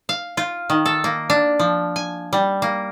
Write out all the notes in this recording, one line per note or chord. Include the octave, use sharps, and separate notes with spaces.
F5
F4
D#3
A4
A#3
D4
F3
G#5
G3
A#3